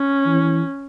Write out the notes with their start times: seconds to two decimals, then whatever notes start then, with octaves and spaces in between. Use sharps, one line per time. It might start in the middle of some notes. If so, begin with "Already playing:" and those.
Already playing: C#4
0.26 E3